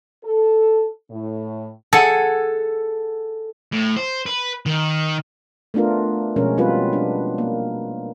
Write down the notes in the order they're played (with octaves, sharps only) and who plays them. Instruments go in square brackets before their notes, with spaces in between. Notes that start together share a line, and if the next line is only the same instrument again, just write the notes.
[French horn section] A4
A2
[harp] G#4 F#5 G#5 [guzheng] A4
[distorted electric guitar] A2
C5
B4
D#3
[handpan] A3 B3 D4 F4 A#4
B2 F3 G#3 C#4 A#4
F#3 G3 B3 C4 F4 B4
D4
A#3